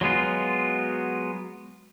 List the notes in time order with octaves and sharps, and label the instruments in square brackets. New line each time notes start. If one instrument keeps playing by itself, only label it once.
[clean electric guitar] F#3 G#3 B3 F4